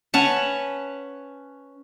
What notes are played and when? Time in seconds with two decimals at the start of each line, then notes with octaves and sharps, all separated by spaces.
0.14 C#4 B4 F#5 A5